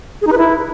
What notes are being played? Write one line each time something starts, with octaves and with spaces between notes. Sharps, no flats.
G#4
D#4
B4
E4